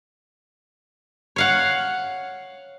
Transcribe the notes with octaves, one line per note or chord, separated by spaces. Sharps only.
C#5 F5 F#5